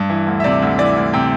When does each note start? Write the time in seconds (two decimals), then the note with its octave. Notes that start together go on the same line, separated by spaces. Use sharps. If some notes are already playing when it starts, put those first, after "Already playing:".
Already playing: G2
0.10 E3
0.27 D2
0.40 E5
0.44 C3 D5
0.62 D2
0.78 E3 D5
0.96 D2
1.13 C3 G5